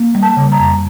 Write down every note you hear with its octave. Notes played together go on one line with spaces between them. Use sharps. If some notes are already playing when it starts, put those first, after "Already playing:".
Already playing: A#3
G3
A5
C#3
A#5
F2